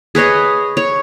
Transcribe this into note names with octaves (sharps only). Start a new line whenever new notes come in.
G#4 B4 C#5 D#5
C#5